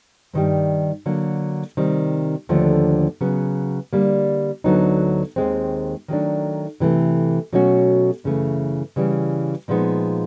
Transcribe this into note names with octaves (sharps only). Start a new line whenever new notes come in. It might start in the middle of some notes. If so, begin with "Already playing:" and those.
G2 D#3 G3
D3 F#3 A#3
C3 D#3 G3 C4
D#2 D3 F3 A3 D4
C#3 F#3 B3
D3 G3 A#3
D2 D3 F#3 B3 D#4
D#2 D#3 G#3 C4
D#3 F#3 A3 D4
C3 E3 A3
B2 F#3 A3 C#4 F#4
F#2 C#3 E3 A3
C#3 E3 G3
A#2 F3 G#3 B3 D#4